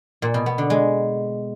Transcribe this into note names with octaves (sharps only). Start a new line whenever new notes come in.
A#2
B2
B3
D3
G#3